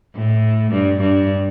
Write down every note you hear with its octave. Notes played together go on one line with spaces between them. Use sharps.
A2
G2
G2